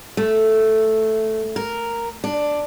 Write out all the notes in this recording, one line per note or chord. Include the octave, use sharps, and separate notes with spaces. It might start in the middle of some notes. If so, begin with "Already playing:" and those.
A3
A#4
D4